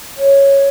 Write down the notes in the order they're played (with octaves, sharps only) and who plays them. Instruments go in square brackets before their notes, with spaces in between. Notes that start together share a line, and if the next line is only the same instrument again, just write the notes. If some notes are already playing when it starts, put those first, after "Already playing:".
[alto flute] C#5